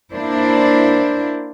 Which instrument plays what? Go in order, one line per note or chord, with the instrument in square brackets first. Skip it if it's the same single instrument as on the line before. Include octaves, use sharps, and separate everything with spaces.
[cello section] A#3 D4 E4 C5